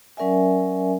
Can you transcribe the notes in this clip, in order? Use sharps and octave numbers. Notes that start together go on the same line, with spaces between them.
F#3 C#4 A#4 D5 E5 G#5